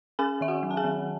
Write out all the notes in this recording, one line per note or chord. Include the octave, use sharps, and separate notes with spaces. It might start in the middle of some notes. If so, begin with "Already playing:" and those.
C#4 G#4 G#5
D#3 E5
F#4 F#5
F#3
A5
G#4 G#5
D#3